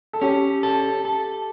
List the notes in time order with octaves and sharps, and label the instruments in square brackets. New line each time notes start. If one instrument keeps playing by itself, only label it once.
[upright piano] A4
[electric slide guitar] C#4 [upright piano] G4
[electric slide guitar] A4
A4